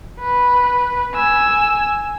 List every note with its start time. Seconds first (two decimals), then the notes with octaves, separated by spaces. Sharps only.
0.20 B4
1.15 G#5 E6